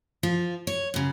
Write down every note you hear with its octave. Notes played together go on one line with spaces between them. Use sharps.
F3 F4
C#5
F#2 C#3